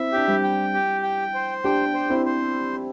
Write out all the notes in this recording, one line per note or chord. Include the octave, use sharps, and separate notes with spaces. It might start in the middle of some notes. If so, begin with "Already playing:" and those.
Already playing: C4 E4 E5
D4 G4
G3 C4
G5
G4
G5
C5
D4 G4 G5
C5
C4 E4
C5